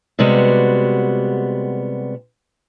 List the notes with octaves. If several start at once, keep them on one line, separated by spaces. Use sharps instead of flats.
C3 G3 G#3 B3 F#4